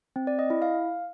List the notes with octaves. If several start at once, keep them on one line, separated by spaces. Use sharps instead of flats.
C4
D5
D#5
E4
F5